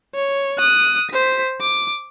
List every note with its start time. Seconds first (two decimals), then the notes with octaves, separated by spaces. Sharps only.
0.15 C#5
0.59 D#6 F#6
1.11 C5 B6
1.61 D6